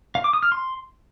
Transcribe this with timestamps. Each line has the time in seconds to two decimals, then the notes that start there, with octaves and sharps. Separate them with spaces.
0.15 F5
0.24 D6
0.33 D#6
0.43 F6
0.52 C6